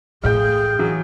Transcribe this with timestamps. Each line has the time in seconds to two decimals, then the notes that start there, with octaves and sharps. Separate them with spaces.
0.24 A1 A2 G#4 F5 G5
0.79 E3 F#3